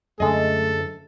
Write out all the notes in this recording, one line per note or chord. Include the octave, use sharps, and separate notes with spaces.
F#2 D3 G#3 A3 A4 D#5